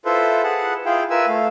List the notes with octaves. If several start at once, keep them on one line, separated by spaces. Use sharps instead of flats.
E4 F4 A4 B4 C5 E5
G#4 B4 F#5 A5
E4 F4 G#4 F5 G5
F4 A#4 B4 E5 G#5 E6
A3 F5